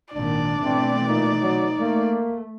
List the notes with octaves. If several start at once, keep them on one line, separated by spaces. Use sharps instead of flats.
G#1 A#2 D#3 D4 D5
B2 E3 A3 C4
A#2 D#4
F#3
A3 A#3